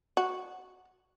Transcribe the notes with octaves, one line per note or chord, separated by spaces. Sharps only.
F#4